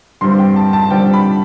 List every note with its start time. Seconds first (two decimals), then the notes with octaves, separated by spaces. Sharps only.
0.21 G2 D3 G3 C4 C6
0.39 G5
0.56 A5
0.73 A5
0.90 G2 D3 G3 C4 G5
1.13 B5